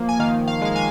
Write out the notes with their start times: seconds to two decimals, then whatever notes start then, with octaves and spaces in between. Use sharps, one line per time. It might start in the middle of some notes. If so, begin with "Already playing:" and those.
Already playing: F3 A#3
0.09 G#5
0.19 D#3 F5
0.48 F5
0.61 G#3 F5
0.76 G#5